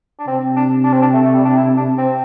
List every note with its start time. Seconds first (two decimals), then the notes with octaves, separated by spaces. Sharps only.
0.19 D4
0.27 C3 C4
0.56 D4
0.84 D4
0.93 C4
1.02 D4
1.13 A3
1.24 A3
1.34 G3
1.45 D4
1.56 E4
1.77 D4
1.98 C4